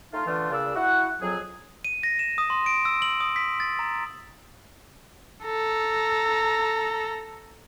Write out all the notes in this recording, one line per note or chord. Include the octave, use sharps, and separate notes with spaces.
A3 D#4 F4
D3 E3 A3 F4
A#2 C#3 D4 E6
E4 F#4 F#5
F2 F#3 G#4
D#7
A#6
E7
D#6
C6
D7
E6
F#7
D#6
B6
A6
A#5
A4 A#5